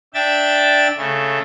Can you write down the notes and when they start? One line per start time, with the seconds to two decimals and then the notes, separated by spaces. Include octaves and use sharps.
0.14 D4 E5 G5 A6
0.97 C#3 A3